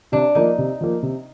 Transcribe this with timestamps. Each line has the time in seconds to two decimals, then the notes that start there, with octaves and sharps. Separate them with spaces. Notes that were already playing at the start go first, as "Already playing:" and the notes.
0.12 C3 D4
0.35 F3 A#3 D#4
0.58 C3
0.81 F3 A#3
1.03 C3